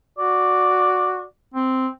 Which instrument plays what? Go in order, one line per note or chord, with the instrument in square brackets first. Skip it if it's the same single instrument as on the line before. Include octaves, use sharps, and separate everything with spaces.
[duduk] F#4 [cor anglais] D5
[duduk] C4